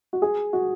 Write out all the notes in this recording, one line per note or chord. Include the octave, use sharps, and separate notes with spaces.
F#4
G#4
F#4